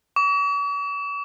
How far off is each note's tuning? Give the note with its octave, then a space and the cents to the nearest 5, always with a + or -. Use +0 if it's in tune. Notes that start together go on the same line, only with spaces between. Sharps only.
C#6 +45